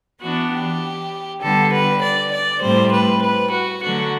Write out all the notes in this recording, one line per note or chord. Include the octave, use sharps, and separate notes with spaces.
E3 B3 D4 F#4
G4
D3 G3 B3 A4
B4
D5
D5
A2 G3 C4 C5
B4
B4
F#4
D3 F#3 A3 D4 F#4